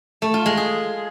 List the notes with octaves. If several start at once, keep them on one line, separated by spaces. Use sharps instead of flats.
A3
F4
G#3
G#4